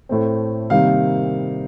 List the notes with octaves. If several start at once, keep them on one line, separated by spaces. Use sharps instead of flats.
A2 A3 C4
C3 D#3 G3 A#3 F5